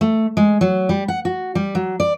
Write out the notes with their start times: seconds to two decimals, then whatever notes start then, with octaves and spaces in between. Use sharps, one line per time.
0.01 A3
0.37 G#3
0.61 F#3
0.89 G3
1.08 F#5
1.25 F#4
1.55 G3
1.75 F#3
2.00 D5